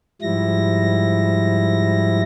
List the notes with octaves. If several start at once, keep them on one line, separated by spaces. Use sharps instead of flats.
G#2 F3 G3 E4 A#6